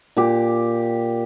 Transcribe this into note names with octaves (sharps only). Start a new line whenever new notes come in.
A#2 G4